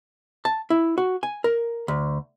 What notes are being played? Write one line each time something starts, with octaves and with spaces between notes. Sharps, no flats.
A5
E4
F#4
G#5
A#4
D2